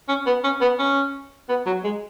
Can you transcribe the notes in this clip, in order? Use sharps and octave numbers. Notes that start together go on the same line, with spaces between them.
C#4
B3
C#4
B3
C#4
B3
F#3
G#3